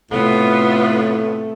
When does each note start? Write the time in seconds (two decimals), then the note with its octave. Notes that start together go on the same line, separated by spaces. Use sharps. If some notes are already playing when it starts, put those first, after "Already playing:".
0.11 A2 C3 A3 B3 F4